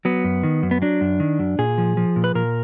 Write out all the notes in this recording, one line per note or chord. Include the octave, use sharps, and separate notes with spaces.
F#3 B3
F#2
D#3
F#2
B3
F#3 D4
F#2
D#3
F#2
A#2 G#4
F3
F3
A#2
B4
A#2 A#4